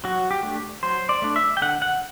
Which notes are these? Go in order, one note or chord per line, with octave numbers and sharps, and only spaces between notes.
F#3 F#4
G4
A3 D4
F#3 C5
D5
A3 D4
E5
G5
D3 F#5
F#5